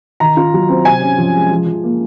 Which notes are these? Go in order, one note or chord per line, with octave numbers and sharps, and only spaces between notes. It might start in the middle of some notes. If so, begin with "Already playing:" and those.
D#3 A#5
F4
F#3
C4
C3 G#5
C#4
F3
G#3
F3
F3
A#3